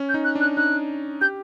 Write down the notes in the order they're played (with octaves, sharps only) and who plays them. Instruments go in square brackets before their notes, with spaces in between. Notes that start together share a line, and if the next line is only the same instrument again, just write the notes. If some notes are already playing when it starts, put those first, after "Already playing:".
Already playing: [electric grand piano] C#4
[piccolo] G6
[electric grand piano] D#4
[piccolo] F#6
[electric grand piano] D4
[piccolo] F#6
[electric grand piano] D#4 [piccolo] F#6
[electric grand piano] G4 [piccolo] G6